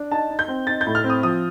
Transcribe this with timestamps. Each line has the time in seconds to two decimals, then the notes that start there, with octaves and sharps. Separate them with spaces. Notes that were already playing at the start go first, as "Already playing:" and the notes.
Already playing: D4
0.11 D#4 A5
0.30 D#4
0.39 G6
0.48 C4
0.67 D#4 A6
0.81 G6
0.87 A2
0.95 F6
1.04 C4
1.10 D#6
1.23 F3 D#6